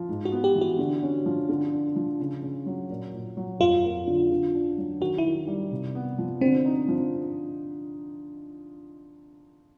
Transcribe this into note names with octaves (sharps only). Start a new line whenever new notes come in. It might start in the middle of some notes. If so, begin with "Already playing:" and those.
Already playing: F3
G#2
F#4
B3
G4
E3
F#4
D3
C#4
F3
D3
D4
F3
C#3
C#3
F#3
A#2
A#2
F#3
F2 F4
A#3
D3
D3
D4
F#3
D#3 F#4
E4
D#3
G3
C3
B3
F3
D3 C4
D#4
F3